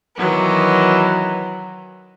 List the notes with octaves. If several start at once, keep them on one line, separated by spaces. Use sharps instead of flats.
D#3 E3 F#3 B3